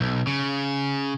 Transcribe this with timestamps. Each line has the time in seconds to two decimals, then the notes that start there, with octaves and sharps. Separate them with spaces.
0.01 B1
0.27 C#3